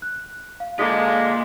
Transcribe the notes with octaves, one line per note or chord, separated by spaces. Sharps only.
F#6
F5
D3 G#3 A#3 F4 D#5 D6 B6